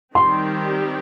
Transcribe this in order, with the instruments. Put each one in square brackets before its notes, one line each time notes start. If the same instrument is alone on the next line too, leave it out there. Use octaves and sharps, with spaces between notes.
[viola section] D#3 G3 C4 G4 [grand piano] C6